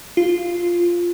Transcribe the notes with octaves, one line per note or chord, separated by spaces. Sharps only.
F4